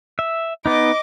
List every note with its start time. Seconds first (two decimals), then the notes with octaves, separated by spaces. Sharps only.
0.19 E5
0.66 B3 D#4 D#5 D6